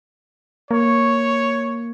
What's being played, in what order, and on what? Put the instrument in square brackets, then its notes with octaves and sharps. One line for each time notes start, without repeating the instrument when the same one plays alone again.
[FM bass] A#3 [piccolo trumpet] C#5